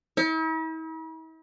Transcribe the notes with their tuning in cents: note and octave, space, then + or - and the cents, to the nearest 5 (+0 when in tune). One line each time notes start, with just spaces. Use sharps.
E4 -45